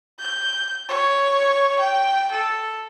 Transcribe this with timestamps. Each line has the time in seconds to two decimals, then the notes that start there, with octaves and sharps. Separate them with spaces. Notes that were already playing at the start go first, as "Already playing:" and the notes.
0.20 G6
0.89 C#5
1.79 G5
2.32 A4